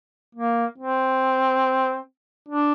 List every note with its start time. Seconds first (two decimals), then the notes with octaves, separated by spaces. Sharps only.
0.35 A#3
0.79 C4
2.49 D4